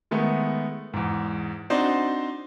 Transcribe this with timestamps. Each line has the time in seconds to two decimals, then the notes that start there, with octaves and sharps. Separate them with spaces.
0.11 D#3 G#3 A3 B3
0.94 E2 G#2
1.70 C4 D4 D#4 F#4 C5 D5